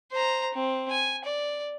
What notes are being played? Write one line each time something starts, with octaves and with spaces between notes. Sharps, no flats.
C5 A#5
C4
G#5
D5